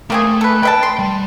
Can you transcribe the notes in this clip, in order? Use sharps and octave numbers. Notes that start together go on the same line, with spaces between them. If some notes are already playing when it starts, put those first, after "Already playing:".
A3 A#3 C4 G#4
A4 B4
B4 E5 G5 A5
C6
G3